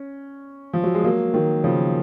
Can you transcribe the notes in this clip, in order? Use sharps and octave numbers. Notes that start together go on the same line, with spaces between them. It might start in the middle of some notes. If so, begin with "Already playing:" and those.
Already playing: C#4
F3
F#3
G#3
F#3 A#3
D#3 F#3
C#3 F3